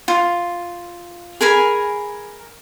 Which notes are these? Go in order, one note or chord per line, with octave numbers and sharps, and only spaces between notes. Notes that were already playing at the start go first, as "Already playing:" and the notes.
F4
G#4 A#4 G#5 B5